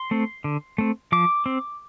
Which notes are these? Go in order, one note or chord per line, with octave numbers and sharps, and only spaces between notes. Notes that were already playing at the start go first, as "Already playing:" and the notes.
Already playing: C6
A3 C4
D3
A3 C4
F3 D6
C4